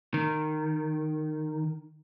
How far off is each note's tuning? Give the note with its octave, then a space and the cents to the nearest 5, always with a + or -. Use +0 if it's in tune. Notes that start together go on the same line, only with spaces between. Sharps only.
D#3 -15